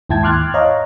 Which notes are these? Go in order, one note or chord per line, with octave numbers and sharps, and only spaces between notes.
D#2 G#2 E4 G5 A5 G#6
C6 D6 F6 F#6 G#6 A6
C#5 D#5 F5 A#5